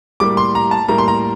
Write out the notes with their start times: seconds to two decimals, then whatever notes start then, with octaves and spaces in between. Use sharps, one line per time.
0.20 A2 G3 A#3 D6
0.37 C6
0.55 A#5
0.71 A5
0.88 A2 G3 A#3 A#5
0.98 C6
1.08 A#5